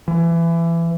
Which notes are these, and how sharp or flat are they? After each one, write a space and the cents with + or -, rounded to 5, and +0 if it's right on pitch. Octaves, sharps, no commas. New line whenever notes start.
E3 +25